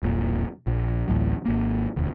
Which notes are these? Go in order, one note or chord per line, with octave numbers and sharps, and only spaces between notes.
E1 B1 A#2
A#1
A1 D2 A2 F#3
G#1 A#3
E1 D2